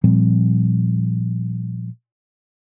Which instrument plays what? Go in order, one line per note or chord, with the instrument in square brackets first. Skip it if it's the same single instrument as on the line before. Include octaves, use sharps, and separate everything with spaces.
[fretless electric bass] A#2 F3 G3 C4